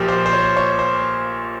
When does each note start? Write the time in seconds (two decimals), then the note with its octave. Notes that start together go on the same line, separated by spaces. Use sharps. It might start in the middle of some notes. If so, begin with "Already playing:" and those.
Already playing: A#1 A#2 F3 G4
0.08 C5
0.26 C5
0.33 C#5
0.57 C#5
0.79 C5